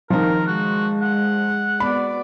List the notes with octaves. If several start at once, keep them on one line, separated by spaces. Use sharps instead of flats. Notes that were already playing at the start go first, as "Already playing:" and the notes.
D#3 F3 A#4
G#3 F#4
F#5
B3 F#4 D5 B5